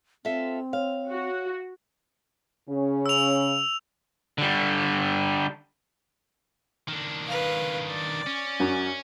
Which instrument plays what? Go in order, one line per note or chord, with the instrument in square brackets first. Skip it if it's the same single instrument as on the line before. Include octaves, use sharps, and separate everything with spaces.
[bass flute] C4 [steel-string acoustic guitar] F4 A4 E5
[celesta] C#5 [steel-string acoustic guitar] F5
[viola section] F#4
[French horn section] C#3 C#4
[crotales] E6 F7
[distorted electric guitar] D3 G3
D#3 D4
[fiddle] B4 F5
D5
[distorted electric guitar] C#4
[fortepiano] F#2